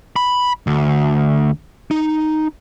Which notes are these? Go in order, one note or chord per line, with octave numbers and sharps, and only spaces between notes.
B5
D2
D#4